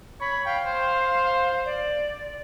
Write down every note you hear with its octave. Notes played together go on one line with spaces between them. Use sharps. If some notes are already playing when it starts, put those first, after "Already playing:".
C#5 B5
F5 G5
C5
D5